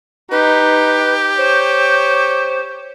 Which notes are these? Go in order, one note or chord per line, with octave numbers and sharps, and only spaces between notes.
D#4 G4 B4
C5 C#5